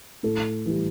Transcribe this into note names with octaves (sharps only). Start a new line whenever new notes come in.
A2 A4
E3 G3